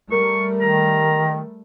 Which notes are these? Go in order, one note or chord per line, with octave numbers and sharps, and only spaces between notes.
G3 A3 A#4 C#6
D#3 A#5